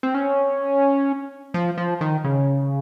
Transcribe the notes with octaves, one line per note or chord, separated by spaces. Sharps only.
C4
C#4
F3
F3
D#3
C#3